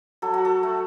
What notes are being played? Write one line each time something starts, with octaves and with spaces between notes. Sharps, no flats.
F#3 A4
F#4
A4
A3